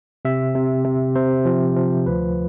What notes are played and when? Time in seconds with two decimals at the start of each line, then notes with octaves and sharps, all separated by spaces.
0.25 C3 E5
0.55 C3
0.85 C3
1.16 C3 C5
1.45 F3
1.76 F3
2.07 D2 B4